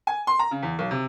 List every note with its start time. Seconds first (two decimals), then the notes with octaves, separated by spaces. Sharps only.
0.07 G#5
0.27 C6
0.39 A#5
0.51 C#3
0.63 E2
0.79 B1
0.91 C3